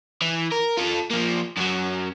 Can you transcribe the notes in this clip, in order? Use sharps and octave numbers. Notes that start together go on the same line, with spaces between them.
E3
A#4
F4 A4
F3 A#3
F#2 F#3